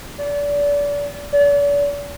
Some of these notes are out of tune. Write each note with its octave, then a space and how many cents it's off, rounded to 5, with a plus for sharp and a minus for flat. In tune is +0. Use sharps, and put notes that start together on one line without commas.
D5 -30
D5 -40